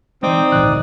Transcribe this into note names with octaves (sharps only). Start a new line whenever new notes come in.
E3 G#3 C4 D#4 D5 D#6
G#1 D2 A#2 E3 F#6